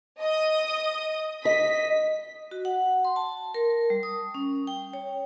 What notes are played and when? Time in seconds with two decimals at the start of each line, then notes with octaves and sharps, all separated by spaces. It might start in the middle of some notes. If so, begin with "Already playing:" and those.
0.20 D#5 D#6
1.45 D#5 B6
2.51 F#4
2.65 F#5
3.05 C6
3.16 A5
3.54 A#4
3.90 G3
4.03 D#6
4.35 C#4
4.67 G5
4.93 C#5